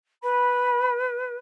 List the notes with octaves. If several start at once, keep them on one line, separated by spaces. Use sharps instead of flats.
B4 B5